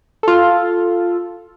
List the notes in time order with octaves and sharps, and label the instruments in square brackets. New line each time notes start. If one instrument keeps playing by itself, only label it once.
[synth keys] F4 A4